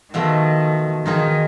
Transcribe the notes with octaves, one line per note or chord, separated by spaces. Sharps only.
B2 D#3 F3 A3
D#3 D#4 F4 G#4